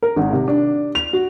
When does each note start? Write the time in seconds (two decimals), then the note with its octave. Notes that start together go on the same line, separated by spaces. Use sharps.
0.03 A#4
0.16 G#1
0.33 C3
0.48 D4
0.95 F7
1.13 F#4